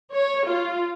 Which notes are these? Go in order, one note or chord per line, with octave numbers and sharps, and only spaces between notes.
C#5
F4